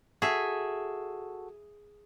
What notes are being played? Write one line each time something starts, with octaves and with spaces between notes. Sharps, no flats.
F#4 G#4 A4 E5